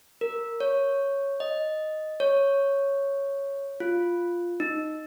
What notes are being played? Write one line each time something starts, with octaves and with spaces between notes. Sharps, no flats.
A#4
C#5
D#5
C#5
F4
D#4